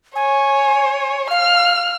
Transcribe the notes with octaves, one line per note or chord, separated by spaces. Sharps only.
C#5 G#5
F5 F6